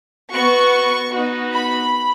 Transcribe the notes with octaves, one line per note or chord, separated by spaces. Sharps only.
B3 F#4 C#6
B3 D#4 F#4
B5